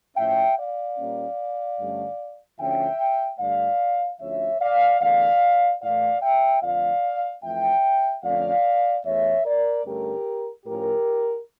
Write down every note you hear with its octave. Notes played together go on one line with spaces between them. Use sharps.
A2 F3 C#4 E5 G5
D5 F5
A#2 G3 A#3 C#4
G2 D3 A3 C#4
D2 D3 F3 C#4 E5 G5
G2 D3 A3 D5 F5
D2 D3 F3 C#4 C#5 E5
D5 F5
E2 D3 A3 D5 F5
A2 E3 A3 D5 F5
E5 G5
F2 D3 F3 A3 D5 F5
F2 E3 A3 E5 G5
F2 D3 A3 C#4 D5 F5
E2 E3 A3 C#5 E5
A#4 D5
G2 D3 A3 C#4 G4 A#4
A2 F3 C#4 G4 A#4